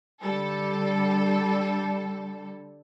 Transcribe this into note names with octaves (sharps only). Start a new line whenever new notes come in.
D3 G3 A4